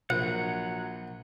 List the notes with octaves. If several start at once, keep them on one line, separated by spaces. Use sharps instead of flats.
A#1 F#3 F#5